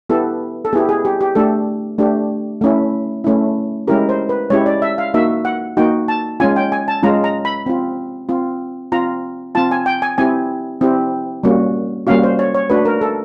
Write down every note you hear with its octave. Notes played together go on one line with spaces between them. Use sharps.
B3 E4 G4 A4
A4
B3 E4 G4 G#4
G#4
G4
G4
A3 D4 G4 A4
A3 D4 G4
A3 C#4 E4
A3 C#4 E4
G#3 C#4 E4 G4 A#4
C5
B4
G#3 C#4 E4 G4 C#5
D5
E5
F5
A#3 D#4 F#4 E5
F#5
A#3 D#4 F#4 G5
A5
G#3 C#4 F4 G#5
G5
G#5
A5
G#3 C#4 F4 A#5
A#5
B5
C4 F4
C4 F4
C4 F4 A#5
C4 F4 A5
G#5
G5
G#5
C4 E4 G4 G#5
C4 E4 G4
G3 A#3 C#4 F#4
G3 A#3 C#4 F#4 F5
C5
C#5
C#5
A3 D4 F#4 B4
A#4
A4